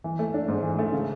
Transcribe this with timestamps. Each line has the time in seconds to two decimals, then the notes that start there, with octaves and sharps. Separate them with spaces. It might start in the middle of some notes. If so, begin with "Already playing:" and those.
0.04 E3
0.19 A3
0.34 D4
0.48 G#2
0.63 E3
0.79 A3
0.92 C#3